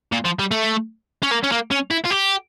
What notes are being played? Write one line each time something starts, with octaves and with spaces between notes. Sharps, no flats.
A#2
F3
G3
A3
C#4
A#3
C#4
A#3
C#4
E4
F4
G4